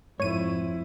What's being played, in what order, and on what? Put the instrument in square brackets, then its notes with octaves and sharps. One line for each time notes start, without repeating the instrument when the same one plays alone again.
[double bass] F2 E4 [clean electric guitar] G#2 [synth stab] C#5 D#7